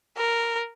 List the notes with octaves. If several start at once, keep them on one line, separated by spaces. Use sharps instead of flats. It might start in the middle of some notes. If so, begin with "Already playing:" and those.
A#4